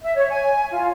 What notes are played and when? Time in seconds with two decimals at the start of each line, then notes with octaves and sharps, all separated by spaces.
0.03 E5
0.16 C#5
0.30 G#5
0.71 F4